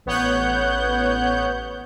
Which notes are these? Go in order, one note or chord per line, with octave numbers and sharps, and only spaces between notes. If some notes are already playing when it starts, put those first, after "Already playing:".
A1 B3 C#5 F#5 F#6 G6